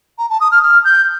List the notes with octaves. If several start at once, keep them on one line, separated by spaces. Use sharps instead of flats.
A#5
A5
D#6
F6
F6
G6